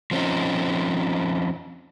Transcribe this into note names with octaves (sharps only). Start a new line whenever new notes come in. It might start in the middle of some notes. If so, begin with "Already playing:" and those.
F3 C4 C#4 D#4